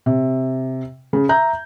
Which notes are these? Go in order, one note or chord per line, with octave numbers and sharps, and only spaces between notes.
C3
C#3
E5 A#5 G6